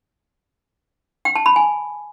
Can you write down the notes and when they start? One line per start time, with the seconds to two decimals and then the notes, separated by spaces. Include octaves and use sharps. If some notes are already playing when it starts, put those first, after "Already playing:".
1.25 G5
1.35 A5
1.46 B5
1.56 G#5